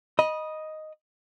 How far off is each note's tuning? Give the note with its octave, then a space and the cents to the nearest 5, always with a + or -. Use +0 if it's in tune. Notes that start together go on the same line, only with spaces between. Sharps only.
D#5 +0 B5 -25